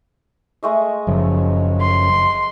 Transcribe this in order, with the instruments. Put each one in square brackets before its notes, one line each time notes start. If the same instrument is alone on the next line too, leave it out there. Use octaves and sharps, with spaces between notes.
[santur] G#3 A3 D#5
[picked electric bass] F#1 C#3 F3 [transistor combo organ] F#2
[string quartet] C6